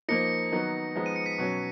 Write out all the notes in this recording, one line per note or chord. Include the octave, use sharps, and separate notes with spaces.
F3 A#3 D#4 A#6 C#7
D#3 F#3 B3 D#4
F3 G#3 B3 D#4
D#7
C#7
B6 D#7
B2 F#3 C#4